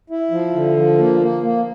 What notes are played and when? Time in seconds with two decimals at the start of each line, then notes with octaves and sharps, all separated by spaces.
0.10 E4
0.31 F3
0.54 D3
0.77 F3
0.98 A#3
1.21 A#3
1.43 A#3